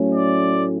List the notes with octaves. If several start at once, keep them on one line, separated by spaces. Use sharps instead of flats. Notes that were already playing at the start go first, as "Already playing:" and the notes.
Already playing: A2 F#3 A3 C#4
D5